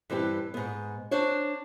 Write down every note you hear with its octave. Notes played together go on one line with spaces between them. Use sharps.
G2 E3 C4 G4
G#2 B3
D4 C5 C#5